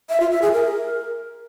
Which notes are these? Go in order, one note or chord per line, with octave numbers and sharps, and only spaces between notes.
E5
F4
E5
G#4
A#4